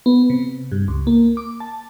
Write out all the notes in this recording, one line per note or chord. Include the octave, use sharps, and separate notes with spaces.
B3
C3
G2
C#2
A#3
D6
A5